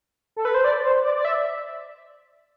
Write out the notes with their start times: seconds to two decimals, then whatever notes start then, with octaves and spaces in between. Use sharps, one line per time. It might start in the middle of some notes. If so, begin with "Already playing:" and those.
0.36 A4
0.45 B4
0.54 C5
0.64 D5
0.84 C5
1.04 D5
1.16 D5
1.25 E5